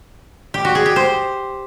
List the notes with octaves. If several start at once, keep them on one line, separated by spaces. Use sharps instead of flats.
G4
F#4
G#4
G4
C5